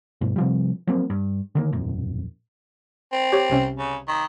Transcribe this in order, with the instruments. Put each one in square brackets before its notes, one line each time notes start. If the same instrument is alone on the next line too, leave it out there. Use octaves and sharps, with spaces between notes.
[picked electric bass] G2 B2
C3 F3 G3
F3 F#3 A#3 C4
G2
D3 D#3 A#3
E1 A#1 F#2
[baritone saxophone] C4
[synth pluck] G4 C#5
C2 C3 C#4
[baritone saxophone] C#3
D#3